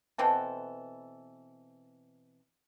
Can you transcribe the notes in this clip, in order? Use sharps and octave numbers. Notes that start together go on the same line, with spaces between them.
B2 E3 C4 A4